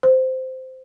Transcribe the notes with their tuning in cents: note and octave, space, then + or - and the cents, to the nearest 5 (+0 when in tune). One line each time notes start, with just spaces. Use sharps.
C5 -10